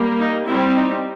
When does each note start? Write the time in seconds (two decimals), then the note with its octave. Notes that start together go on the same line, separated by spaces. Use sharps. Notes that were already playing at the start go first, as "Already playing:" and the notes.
Already playing: G3 A#3
0.20 D#4
0.48 G3 C4 E4
0.76 D#4